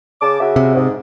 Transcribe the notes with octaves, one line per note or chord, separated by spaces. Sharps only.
C#3 A5 D6
C#3 F#4 E5
C3
G#2